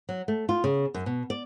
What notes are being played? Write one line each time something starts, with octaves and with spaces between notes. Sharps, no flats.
F#3
A3
F4
C#3
F#2
B2
D5